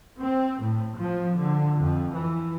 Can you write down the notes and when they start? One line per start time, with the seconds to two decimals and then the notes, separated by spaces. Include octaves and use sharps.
0.20 C4
0.59 A2
0.97 F3
1.37 D3
1.80 F2
2.13 E3